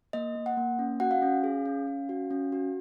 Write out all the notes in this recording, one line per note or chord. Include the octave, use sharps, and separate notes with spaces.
A#3 D#5
A#3
F#5
A#3
C#4
F#4 F#5
F5
C#4
G#4
C#4
C#4
F#4
C#4
F#4